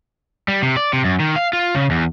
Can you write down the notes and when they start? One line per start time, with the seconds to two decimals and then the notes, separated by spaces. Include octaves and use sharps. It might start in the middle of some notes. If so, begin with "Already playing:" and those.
0.48 G3
0.63 C3
0.77 D5
0.93 C3
1.05 F#2
1.20 D#3
1.36 F5
1.53 F4
1.75 C#3
1.91 E2